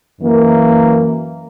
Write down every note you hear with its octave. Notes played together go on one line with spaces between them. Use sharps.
F#2 E3 A#3